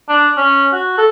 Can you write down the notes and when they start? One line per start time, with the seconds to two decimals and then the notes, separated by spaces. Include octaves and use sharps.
0.09 D4
0.37 C#4
0.73 F#4
0.98 A4